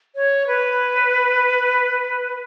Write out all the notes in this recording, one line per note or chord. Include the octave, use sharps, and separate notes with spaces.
C#5
B4